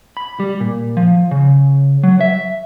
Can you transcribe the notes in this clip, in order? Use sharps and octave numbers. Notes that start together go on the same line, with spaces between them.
B5
G3
A#2
F3
C#3
F#3
E5